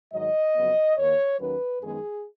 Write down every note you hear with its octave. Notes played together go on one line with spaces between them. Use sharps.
G#2 D#3 F#3 D#5
F2 C#3 F#3 B3
D#2 D#3 A#3 C#5
D#2 D#3 F#3 C#4 B4
F#2 D#3 G#3 B3 D#4 G#4